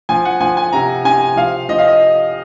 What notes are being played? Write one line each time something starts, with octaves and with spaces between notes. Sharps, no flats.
F3 G#5
F#5
F3 G#5
G#5
C3 A#5
C3 G#5
F3 F5
F3 D#5
F5
D#5